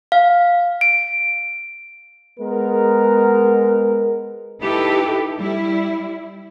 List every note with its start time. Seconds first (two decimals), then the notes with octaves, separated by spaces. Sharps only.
0.12 F5
0.81 D7
2.40 G#3 B3 A#4
4.62 D#4 E4 G4 A4 B4
5.39 G3 E4